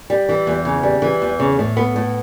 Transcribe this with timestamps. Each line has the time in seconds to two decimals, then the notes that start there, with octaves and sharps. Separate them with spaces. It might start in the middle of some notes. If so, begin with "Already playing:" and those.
0.10 G3
0.29 E3
0.47 E2
0.65 C#3
0.83 G3
1.02 E3
1.22 E2
1.40 C#3
1.59 A2
1.77 B3
1.96 A2